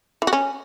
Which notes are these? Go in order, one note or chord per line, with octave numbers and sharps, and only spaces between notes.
E3
F#4
C#4